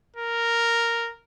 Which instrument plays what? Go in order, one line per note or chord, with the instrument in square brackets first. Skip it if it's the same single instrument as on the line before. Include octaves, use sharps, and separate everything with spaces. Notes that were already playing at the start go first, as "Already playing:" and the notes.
[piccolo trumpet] A#4